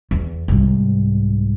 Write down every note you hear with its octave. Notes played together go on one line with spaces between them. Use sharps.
E2
C2 G#2